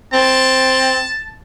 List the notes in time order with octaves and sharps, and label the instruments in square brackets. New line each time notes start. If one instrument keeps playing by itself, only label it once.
[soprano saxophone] C4 [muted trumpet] A5